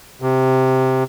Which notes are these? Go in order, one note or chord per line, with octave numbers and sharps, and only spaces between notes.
C3